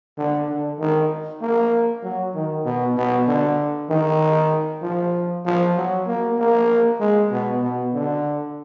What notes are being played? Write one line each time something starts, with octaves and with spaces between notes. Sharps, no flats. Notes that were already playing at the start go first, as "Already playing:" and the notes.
D3
D3
D#3
A#3
F#3
D#3
B2
B2
D3
D#3
F3
F3
F#3
A#3
A#3
G#3
B2
B2
D3